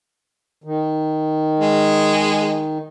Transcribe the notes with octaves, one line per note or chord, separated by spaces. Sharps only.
D#3
G#3